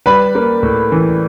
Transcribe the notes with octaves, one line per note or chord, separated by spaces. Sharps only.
G3 B4 B5
A#3
A2
E3